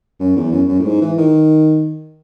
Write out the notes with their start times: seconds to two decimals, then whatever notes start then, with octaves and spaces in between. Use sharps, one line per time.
0.20 F#2
0.36 E2
0.52 F#2
0.69 F#2
0.79 A2
0.86 G#2
1.01 E3
1.18 D#3